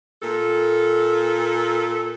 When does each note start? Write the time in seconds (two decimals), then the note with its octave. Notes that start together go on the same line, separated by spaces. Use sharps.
0.21 A#2 A4